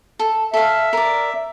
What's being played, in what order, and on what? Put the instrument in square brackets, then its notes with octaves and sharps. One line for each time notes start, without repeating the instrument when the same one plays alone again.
[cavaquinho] A4
[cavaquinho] A4 F5 [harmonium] E5
[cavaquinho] A#4 D5